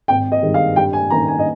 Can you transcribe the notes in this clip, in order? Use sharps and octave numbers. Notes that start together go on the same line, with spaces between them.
G#1 G5
D#5
G2 D#3 G#3
F5
G2 G5
G#5
D#3 A#3 C#4 A#5
G#5
D#5